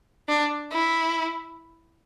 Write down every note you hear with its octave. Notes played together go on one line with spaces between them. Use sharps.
D4
E4